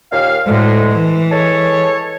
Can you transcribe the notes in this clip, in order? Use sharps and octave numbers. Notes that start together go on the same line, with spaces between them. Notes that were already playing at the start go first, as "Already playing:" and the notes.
D#2 A#2 F5
D2 A2 G#3
E3
G#3 A4 C#5